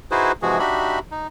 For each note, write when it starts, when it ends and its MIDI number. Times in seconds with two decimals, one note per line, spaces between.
0.11 0.32 63
0.11 0.32 64
0.11 0.32 66
0.11 0.32 68
0.11 0.32 71
0.11 0.32 72
0.42 0.59 48
0.42 0.59 52
0.42 0.59 53
0.42 0.59 56
0.42 0.59 66
0.42 0.59 68
0.59 0.99 62
0.59 0.99 63
0.59 0.99 66
0.59 0.99 67
0.59 0.99 76
0.59 0.99 83
1.11 1.27 63